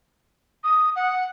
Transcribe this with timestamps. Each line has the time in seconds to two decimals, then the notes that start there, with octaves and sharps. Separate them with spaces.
0.64 D#6
0.96 F#5